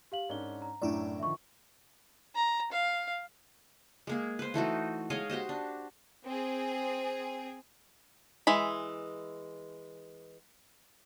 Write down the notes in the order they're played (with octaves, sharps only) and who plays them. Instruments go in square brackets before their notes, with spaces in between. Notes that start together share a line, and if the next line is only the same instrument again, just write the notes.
[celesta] G4 F5 F#7
[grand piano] G#2 C#4 D4 [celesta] A#4 G7
[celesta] A#5
[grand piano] F#2 A2 A3 [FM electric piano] D4 E4 D5
[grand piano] D3 D#3 F3 [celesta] E5 C#6
[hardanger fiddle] A#5
F5
[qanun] G#3 A#3 G#4
B4 C5
E3 A3 D#4 F#4
G#3 C#5 D#5 F5
F#4 G4 C5 D#5
D4
[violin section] C4 G#4
[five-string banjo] E3 G#3 B5